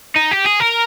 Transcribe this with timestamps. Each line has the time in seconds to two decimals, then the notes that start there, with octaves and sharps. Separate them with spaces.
0.16 D#4
0.31 G4
0.46 G#4
0.60 A#4